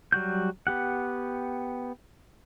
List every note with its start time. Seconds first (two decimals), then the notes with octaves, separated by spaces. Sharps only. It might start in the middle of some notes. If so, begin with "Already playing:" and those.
0.12 F#3 G3 F#4 G6
0.67 B3 G4 F#5